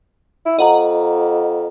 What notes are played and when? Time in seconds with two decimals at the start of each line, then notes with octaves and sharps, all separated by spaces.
0.46 E4
0.59 F2 D#5 F#5 A#5